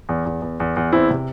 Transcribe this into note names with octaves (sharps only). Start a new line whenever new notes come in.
E2
E2
E2
E2
E2
E2 C4 E4
C3